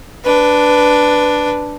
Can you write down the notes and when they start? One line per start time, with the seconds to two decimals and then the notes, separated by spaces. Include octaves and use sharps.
0.25 D4 B4